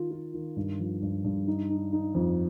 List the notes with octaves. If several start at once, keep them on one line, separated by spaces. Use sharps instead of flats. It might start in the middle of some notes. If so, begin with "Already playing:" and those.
Already playing: D#3 F4
F4
D#3
G2
F3
G2
G2
D#4
D#4
D#4
F2